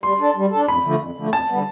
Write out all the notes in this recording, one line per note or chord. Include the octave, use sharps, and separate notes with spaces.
G3 C6
D4 A4
G3
D4 A4
F2 B5
D3 F3 A3
F2
D3 F3 A3
F2 A5
D3 G3 B3